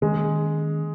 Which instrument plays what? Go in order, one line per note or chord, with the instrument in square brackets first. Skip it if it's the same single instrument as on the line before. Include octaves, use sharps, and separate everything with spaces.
[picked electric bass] D#3 A#3 C#4 [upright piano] G#3